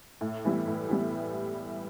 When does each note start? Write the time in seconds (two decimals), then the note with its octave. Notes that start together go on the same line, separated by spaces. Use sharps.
0.21 A2
0.45 E3 G3 B3 E4
0.67 A2
0.89 E3 G3 B3 E4